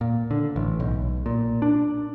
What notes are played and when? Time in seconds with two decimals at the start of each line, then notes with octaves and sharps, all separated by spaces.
0.01 A#2
0.31 D3
0.56 A1
0.80 B1
1.26 A#2
1.62 D4